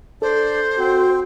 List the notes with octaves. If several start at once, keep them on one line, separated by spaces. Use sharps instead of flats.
D4 A4 C5 D5
C4 F#4